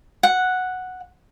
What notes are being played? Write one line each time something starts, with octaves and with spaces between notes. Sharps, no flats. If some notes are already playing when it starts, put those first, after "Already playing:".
F#5